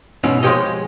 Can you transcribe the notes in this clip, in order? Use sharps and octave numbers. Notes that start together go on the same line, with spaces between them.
G#2 B2 E3 C#4
F3 G#3 A3 G4 C#5 D#5